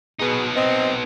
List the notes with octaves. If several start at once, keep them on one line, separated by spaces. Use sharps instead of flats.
B2 B3 D#4 G#4
C4 D#5